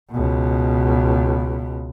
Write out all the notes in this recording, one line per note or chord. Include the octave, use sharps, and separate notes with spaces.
C#2 B2